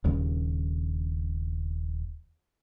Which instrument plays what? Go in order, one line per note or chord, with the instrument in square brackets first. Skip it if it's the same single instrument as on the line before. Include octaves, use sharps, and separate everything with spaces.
[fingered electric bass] D#1 D#2 C#3